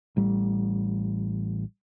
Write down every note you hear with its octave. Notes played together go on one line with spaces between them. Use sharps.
A1 G3